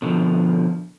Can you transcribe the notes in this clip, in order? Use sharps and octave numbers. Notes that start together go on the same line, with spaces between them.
B2 D3 D#3 F3